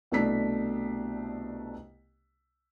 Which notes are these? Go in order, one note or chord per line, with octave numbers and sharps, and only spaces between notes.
C2 B2 A3 D4 B6